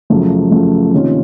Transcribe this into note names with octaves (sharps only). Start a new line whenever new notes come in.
F#2 C#3 F3 A3
F#2 C#3 F3 A3
C3 D#3 A#3 C#4 F4